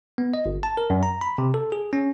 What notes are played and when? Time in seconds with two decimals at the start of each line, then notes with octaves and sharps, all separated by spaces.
0.18 B3
0.34 D#5
0.46 G1
0.63 A5
0.77 A#4
0.90 F#2
1.03 A#5
1.21 B5
1.38 C3
1.54 A4
1.72 G#4
1.93 C#4